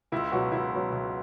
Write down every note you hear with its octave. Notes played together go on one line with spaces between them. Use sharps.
C#2 E4
B2 F#3 F#4
C#2 E4
B2 F#3
C#2